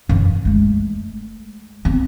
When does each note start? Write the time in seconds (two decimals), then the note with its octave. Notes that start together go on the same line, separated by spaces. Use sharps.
0.09 F#2 E3
0.45 G#3 A3
1.85 B3 C4